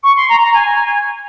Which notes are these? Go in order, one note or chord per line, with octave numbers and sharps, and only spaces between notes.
C#6
C6
A#5
A#5
G#5